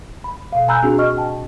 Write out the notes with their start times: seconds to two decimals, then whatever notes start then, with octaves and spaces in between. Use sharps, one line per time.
0.24 B5
0.53 B2 F5
0.68 G#5 A#5 B5 E6 F#6 G6
0.83 C4 D4 F#4 G#4
0.98 D#5 C#6 F6
1.17 G5 A5